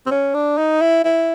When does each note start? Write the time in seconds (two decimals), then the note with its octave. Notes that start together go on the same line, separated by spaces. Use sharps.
0.06 C4
0.11 C#4
0.35 D4
0.58 D#4
0.81 E4
1.05 E4